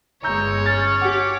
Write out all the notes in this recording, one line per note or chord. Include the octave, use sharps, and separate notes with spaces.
G1 G#3 C#5 A#5 E6 G6
C#4 A6
G4 F#5 D6